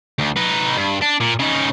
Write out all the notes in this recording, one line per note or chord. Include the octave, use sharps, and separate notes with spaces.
D2
D#4 B4
G2
D4
A#2
C#3 D#4